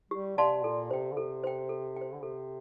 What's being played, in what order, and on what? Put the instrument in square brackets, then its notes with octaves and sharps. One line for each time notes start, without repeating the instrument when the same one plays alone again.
[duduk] G3 [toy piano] G4
[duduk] C3 [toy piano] D5 F5 A5 C6
[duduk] A#2 [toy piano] A4
[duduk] C3 [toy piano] C5 G5
[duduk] D3
[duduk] C3 [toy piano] A4
[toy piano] C5 G5
A4
C5 G5
[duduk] D3
[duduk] C3 [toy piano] A4